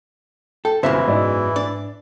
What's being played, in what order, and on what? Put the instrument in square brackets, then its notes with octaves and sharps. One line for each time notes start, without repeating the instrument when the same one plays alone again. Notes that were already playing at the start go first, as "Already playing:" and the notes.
[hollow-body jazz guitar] A4 [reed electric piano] G5
[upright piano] G1 C2 [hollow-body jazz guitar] F#2 B2 G#3 [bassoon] E3 [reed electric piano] C5 E5
[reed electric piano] G#2 [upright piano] E4 D5 D#5
[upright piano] D4 [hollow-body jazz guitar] D5